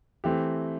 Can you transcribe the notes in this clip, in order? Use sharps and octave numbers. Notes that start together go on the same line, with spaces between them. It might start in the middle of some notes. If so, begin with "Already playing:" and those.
E3 A3 C4 G4